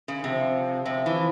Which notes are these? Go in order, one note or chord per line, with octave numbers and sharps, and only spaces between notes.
C#3
C3 F3
C3 F3
E3